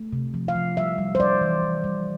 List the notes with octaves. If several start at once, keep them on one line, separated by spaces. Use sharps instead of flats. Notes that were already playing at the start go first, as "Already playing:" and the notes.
Already playing: A3
C3
F3
F5
F3
G3 E5
G3
C5
G3 D5
E3
E3
G3